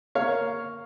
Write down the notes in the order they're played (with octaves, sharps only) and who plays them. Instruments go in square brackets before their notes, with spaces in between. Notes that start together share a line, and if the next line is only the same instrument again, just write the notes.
[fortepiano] A#3 C#5 F5